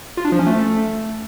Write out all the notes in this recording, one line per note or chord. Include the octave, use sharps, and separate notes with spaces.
F4
D4
F3
C#4
A3